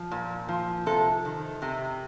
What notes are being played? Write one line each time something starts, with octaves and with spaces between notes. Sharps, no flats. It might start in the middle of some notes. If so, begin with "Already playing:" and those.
Already playing: F3
A#2
F3
C3 A4
D#3
C3